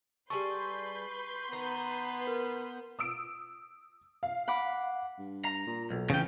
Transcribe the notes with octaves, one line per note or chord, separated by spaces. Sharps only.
G3 G#4 A4 B4 C6 C#6 G6
D#3 B3 A#5
A#4
D#6 E6 D7
F5
F#5 B5 D6
G2
A#5
A#2
B1
F1 C#3 E3 C#4 G5